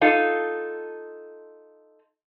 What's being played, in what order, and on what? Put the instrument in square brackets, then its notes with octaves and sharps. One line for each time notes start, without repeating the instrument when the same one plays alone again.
[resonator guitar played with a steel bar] D#4 F4 A4